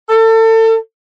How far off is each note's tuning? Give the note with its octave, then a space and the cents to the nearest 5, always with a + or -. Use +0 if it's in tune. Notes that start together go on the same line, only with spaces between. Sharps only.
A4 +30